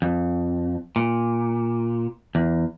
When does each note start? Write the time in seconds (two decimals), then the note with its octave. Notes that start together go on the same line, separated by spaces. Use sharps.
0.02 F2
0.96 A#2
2.35 E2